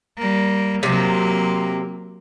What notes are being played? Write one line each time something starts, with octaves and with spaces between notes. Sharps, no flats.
G3 A#3
C3 F#3 A#3 C4